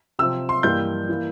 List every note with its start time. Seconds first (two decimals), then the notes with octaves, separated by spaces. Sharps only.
0.19 C3 F3 C4 E6
0.49 C6
0.63 G2 E3 G3 A#3 G6
1.09 E3 A#3